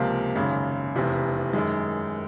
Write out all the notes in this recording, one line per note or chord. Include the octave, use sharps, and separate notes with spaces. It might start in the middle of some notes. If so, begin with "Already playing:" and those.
Already playing: C#2 C3 F3 A#3
G#1 F#2 C#3
F1 E2 C3
F#2 D#3 G#3